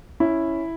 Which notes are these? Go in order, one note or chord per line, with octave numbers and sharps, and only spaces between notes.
C#4 E4